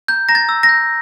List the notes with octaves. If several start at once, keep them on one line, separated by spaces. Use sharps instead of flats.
A#5 G6
A#5 A#6
A6
E6
A#6
G6